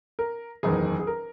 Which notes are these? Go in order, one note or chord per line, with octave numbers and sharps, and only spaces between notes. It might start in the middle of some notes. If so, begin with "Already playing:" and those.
A#4
F#1 E2 D#3 G#4
G#4
A#4